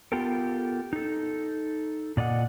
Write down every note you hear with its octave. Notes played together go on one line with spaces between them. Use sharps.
B3 F4 G4 A4 A#4
D#4 A4
A#2 D5 D#5 F#5